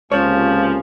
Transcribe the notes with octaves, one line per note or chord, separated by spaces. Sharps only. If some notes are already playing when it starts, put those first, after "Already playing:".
C#2 C3 F3 A#3 C#4 C#5